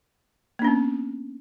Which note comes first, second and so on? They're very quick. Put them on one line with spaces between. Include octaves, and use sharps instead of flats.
A#3 D4 C#4 B3